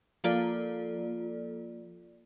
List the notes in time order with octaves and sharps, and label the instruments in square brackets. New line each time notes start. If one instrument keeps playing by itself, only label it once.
[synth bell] F3 A#3 F4 A4 D5